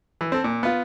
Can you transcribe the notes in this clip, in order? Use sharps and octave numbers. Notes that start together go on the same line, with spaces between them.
E3
C4 A4
A#2
B3 F4